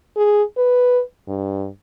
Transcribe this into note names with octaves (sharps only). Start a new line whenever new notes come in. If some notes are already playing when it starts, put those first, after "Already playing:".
G#4
B4
G2